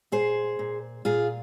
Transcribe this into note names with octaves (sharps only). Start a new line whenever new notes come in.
A#2 G#4 C5
A#2
A#2 F4 G#4